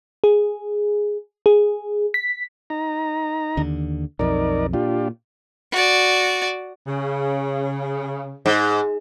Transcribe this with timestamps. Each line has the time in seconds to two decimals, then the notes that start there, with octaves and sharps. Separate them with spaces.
0.24 G#4
1.46 G#4
2.14 B6
2.70 D#4 A#5
3.57 D#2 D3
4.19 B1 F2 D#4 A#4 D5
4.73 A#2 D4 F4 G4
5.72 F#4 D5
6.86 C#3
8.46 G#2